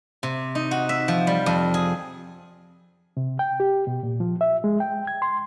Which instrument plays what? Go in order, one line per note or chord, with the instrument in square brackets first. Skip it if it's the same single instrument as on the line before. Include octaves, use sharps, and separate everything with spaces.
[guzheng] C3
D#4
F#4
E5
F3
G3
F2
G#4
[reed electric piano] C3
G5
G4
B2
A#2
F3
E5
G#3
G5
G#6
C6